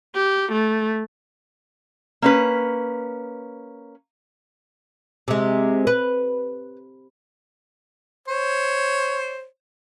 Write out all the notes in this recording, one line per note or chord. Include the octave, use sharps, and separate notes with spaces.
G4
A3
A#3 C#4 B4
C3 G#3
B4
C5 C#5